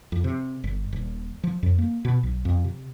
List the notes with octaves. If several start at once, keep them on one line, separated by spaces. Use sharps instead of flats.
F2
C3
G1
D#1
F3
F2
A#3
B2
B1
F2
C3